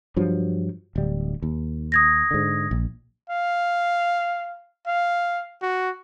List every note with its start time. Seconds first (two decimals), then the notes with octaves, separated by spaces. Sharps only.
0.16 G2 F3 F#3
0.96 D1 G3
1.42 D#2
1.92 D#6 G#6 A#6
2.31 G#2 D3
2.71 A#1
3.30 F5
4.86 F5
5.62 F#4